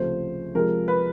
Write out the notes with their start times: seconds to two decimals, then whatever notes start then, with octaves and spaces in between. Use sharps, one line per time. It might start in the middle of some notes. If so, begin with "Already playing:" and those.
Already playing: C#2 C3 F3 A3 C5
0.55 C3 F3 G#3 A#4
0.88 B4